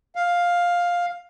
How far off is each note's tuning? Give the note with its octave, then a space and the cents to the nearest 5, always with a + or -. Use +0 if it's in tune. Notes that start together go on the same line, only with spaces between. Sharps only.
F5 +10